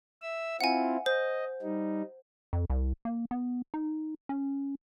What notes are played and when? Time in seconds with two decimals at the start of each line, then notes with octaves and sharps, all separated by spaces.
0.22 E5 E6
0.61 C4 E4 F4 F#5 G#5
1.06 C5 D#5
1.62 G3 D#4
2.53 F2
2.70 C2
3.05 A#3
3.31 B3
3.74 D#4
4.29 C#4